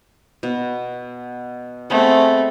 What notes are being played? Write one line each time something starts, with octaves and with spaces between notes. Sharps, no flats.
B2
A3 B3 C4 G#4